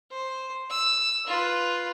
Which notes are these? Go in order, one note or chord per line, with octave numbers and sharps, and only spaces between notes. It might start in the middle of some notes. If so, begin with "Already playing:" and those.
C5
E6
F4 B4